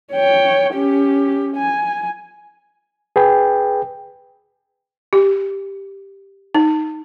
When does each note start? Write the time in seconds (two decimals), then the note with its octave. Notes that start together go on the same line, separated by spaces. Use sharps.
0.13 C#5 G5
0.74 C#4 G4
1.56 G#5
3.16 G#4 B4 G5
5.13 G4
6.54 D#4